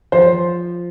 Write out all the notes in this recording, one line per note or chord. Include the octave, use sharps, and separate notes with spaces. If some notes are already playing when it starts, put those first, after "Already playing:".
F3 C5